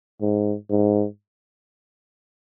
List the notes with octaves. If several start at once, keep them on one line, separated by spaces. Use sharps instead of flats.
G#2
G#2